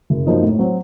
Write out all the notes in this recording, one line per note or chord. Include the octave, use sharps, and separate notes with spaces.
F#1
F#2 F3 A#3 D#4
A2
F#3 C4